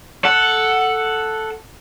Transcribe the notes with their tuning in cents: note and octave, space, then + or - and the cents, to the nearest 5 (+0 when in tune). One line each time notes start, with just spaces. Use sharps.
A4 +0 F#5 +0